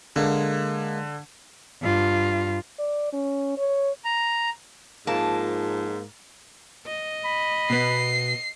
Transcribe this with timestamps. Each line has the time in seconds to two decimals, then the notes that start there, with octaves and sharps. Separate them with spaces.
0.16 D3 G#3 A#3
1.81 G2 F4
2.79 D5
3.13 C#4
3.58 C#5
4.05 A#5
5.07 F2 G#2 A#3 F4 A5
6.87 D#5
7.24 B5
7.70 B2 B3 C7